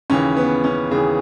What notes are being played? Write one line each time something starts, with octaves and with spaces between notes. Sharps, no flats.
D#2 C#3 E3 C#4
B3
C#4
D#2 C#3 E3 G#4